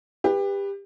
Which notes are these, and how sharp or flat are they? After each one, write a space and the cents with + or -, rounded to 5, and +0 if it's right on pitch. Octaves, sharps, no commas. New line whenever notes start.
G4 +25 B4 +0